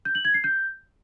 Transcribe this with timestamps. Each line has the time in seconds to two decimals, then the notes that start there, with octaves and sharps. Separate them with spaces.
0.05 G6
0.15 F#7
0.25 G#6
0.34 C7
0.44 G6